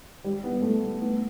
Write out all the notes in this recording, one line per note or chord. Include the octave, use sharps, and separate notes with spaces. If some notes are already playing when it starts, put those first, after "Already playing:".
G3
B3
A3
B3